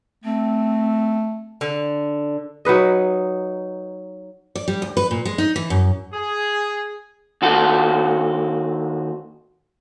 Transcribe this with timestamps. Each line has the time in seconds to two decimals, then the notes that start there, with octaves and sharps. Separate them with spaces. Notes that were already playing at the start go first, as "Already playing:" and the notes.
0.25 A3 C4
1.61 D3
2.65 F#3 D#4 B4 D#5
4.55 D5
4.68 G3
4.82 D2
4.97 B4
5.11 A#2
5.25 G#3
5.38 D#4
5.56 E3
5.70 F#2
6.13 G#4
7.42 D#2 F#4 A4